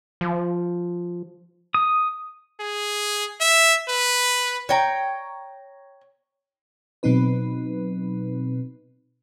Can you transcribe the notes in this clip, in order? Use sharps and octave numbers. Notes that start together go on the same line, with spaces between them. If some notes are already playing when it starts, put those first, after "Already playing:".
F3
D#6
G#4
E5
B4
C#5 G5 A#5
B2 F#3 C4 D#4 B4